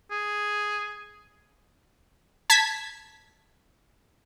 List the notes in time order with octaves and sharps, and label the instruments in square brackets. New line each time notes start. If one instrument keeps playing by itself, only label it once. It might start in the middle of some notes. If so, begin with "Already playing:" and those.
[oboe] G#4
[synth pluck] A5 G#6 B6